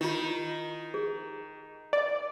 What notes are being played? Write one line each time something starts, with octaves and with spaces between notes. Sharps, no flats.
D#3 E4 F4
G#4
D5